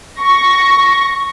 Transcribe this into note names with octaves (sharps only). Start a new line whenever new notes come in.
C#6 A#6